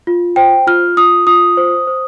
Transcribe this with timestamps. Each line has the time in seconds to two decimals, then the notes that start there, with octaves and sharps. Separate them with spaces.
0.07 F4
0.36 C5 G5
0.67 F4 F6
0.97 F4 D#6
1.27 F4 D#6
1.57 C5
1.87 C5